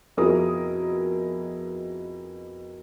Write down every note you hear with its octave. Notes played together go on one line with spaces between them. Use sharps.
F2 B2 E4 G#4 A#4 D#6